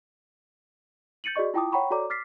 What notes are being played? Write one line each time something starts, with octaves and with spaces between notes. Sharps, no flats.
G6 A6 C#7 D#7 F#7
F#4 G#4 D5 D#5 C#6
E4 F4 G5 A5 D6 D#6
C#5 F#5 G5 A#5 B5 C#6
F#4 A4 C#5 D5 A#5 D6
D6 F6 A6 B6 C7